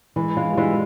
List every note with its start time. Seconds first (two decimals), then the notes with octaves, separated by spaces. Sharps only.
0.16 E3 G#3
0.37 G#3 F4
0.53 G3
0.57 E3 G#3